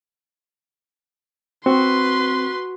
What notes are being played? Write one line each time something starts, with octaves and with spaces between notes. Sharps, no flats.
C4 F#4 B4 C6